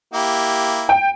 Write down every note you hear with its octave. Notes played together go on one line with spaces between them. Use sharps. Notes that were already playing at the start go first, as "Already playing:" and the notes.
A#3 E4 G4
G5